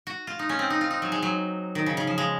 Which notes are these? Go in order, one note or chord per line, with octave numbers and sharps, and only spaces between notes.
F#4
F4
D#4
C#4
C4
D#4
F4
D#4
F#3
G#3
F#3
D#3
C#3
C#3
F3
G#3